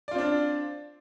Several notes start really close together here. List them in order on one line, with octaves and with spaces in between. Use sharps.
D5 F4 C4 D4